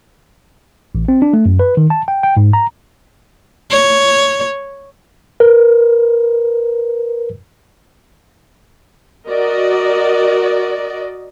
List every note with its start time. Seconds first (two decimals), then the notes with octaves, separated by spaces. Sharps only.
0.95 A1
1.08 C4
1.22 D4
1.33 A3
1.46 F#2
1.59 B4
1.77 D#3
1.90 A5
2.08 G5
2.23 G5
2.37 G#2
2.53 A#5
3.70 C#5
5.40 A#4 B4
9.27 F#4 A#4 D5 D#5